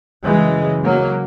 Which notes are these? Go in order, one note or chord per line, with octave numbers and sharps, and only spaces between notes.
F#2 C#3 E3 G#3
F#3 A#3